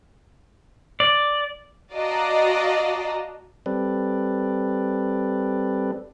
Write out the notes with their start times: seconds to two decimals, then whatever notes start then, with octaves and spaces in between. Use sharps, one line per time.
1.00 D5
1.93 F#4 D5 D#5 F5 A5 A#5
3.66 G3 C4 A4 B4 D5